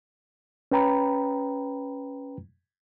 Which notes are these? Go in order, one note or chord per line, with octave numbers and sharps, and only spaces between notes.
C#4 B4 G5 A#5 B5